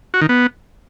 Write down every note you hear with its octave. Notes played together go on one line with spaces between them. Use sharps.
F#4
D#3
B3